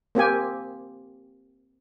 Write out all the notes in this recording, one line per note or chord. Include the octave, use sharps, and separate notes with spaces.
A#3 C4 G4 G#5